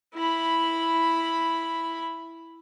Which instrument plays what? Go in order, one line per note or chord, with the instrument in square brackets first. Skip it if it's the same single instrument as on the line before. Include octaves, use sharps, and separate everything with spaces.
[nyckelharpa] E4 B5